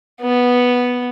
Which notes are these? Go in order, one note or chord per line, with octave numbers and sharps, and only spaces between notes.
B3